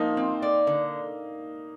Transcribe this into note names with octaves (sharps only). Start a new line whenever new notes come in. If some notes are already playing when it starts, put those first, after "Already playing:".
Already playing: F3 A#3 D#4
C4
D5
D3